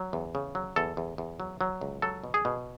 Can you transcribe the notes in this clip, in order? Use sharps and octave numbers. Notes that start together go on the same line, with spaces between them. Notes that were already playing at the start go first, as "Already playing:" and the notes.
Already playing: F#3
E2
C#3
F#3
E2 A4
E2
E2
F#3
F#3
C#2
F#3 A4
B2
G#4
B2